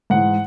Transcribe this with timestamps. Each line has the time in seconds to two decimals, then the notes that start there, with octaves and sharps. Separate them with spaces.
0.10 G#2 E3 F#5